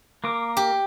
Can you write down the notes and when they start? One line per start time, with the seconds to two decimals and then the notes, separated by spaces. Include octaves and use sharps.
0.24 A#3 A#4 D6
0.57 G4